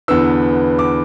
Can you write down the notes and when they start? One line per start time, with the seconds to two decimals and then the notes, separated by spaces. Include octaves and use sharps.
0.08 E2 D3 B3 E6
0.79 D6